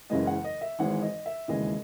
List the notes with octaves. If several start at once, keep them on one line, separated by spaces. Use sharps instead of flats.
F#1 F#2 C#3 E3 G#3 D#5
F#5
D#5
E5
G#1 G#2 E3 G#3 F#5
D#5
E5
E1 D#2 C#3 E3 G#3 D#5